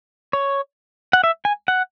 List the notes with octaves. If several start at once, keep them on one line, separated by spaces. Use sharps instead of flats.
C#5
F#5
E5
G#5
F#5